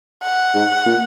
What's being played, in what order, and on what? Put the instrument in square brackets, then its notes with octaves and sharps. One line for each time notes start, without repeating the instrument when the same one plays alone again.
[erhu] F#5
[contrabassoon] G#2
A#2